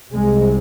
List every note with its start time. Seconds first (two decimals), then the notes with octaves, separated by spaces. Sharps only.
0.14 C2 C3 G#3